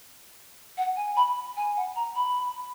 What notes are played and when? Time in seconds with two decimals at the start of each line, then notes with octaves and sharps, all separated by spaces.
0.77 F#5
0.97 G#5
1.17 B5
1.57 G#5
1.77 F#5
1.96 A#5
2.16 B5